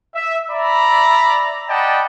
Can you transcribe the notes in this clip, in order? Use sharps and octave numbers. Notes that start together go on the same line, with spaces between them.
E5
D5 E5 A#5 B5
D5 D#5 F#5 G5 A5 B5